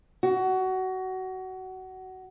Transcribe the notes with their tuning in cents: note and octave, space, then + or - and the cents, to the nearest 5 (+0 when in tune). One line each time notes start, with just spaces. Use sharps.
F#4 +20